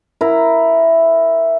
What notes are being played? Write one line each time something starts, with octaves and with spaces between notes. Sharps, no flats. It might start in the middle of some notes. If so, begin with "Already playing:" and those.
E4 A#4